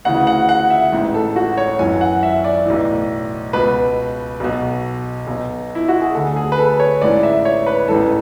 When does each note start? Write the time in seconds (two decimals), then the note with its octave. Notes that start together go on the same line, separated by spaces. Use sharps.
0.05 D2 C#3 E3 F#5
0.27 F#5
0.49 F#5
0.70 E5
0.92 A1 G#2 E3
1.14 A4
1.36 F#4
1.57 C#5
1.79 G#1 F#2 E3 G#5
2.01 F#5
2.23 E5
2.44 D5
2.66 B1 A2 E3
3.53 C#2 B2 B4
4.40 B1 B2
5.27 B1 B2
5.75 E4
5.88 F#4
6.01 G#4
6.14 D2 D3 A4
6.36 G#4
6.52 B4
6.58 A4
6.80 C#5
7.01 A1 G#2 E3 D5
7.23 E5
7.45 C#5
7.67 B4
7.88 A1 G#2 E3 A4